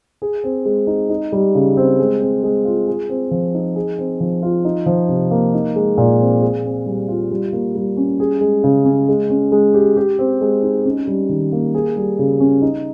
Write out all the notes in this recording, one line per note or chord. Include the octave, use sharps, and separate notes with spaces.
G#4
C4
G#3
D#4
D#4
G3
C#3
C4
G#3
C4
G#3
F4
G#4
C4
F3
D#4
G#4
C4
F3
F4
D#4
F3
C3
A#3
D#4
G#3
A#2
C4
G#4
C4
G3
F4
G3
A#3
G3
C#4
G#4
G#3
C#3
C#4
G#3
C#4
G#3
G4
G4
C4
G#3
D#4
C#4
G3
D#3
A#3
G#4
G3
C#3
C#4
D#4